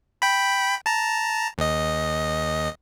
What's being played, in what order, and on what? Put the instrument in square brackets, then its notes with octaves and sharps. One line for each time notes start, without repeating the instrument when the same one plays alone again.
[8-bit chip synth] G5 B5
A5 A#5
D#2 D#5